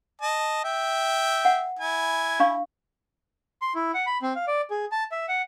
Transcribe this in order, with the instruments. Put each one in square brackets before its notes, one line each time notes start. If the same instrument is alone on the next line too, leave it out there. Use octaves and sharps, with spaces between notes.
[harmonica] D#5 A5
E5 G5
[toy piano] F#5
[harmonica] E4 G#5
[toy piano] D4 F5 C#6
[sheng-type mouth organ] C6
E4
F#5
B5
C4
F5
D5
G#4
A5
E5
F#5